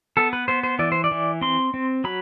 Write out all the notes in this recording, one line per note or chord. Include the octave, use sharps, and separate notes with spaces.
B3 A4
B4
B3 C5
C5
E3 D5
C5
D5
E3
C4 C6
C4
F#3 B5